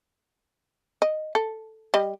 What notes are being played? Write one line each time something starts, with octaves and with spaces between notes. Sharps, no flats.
D#5
A4
G3 D#5